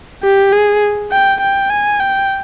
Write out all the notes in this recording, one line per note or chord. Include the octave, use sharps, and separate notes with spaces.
G4
G#4
G5
G5
G#5
G5